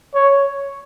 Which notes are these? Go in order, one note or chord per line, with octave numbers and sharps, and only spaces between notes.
C#5